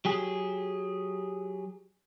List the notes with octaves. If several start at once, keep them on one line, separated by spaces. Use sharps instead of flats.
F#3 G4 G#4